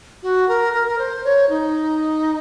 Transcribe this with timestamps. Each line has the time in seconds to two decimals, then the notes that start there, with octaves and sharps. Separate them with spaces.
0.23 F#4
0.48 A#4
0.74 A#4
0.87 A#4
0.98 C5
1.24 C#5
1.49 D#4